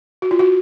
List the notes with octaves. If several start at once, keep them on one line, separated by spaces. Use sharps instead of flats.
F#4
F4
F#4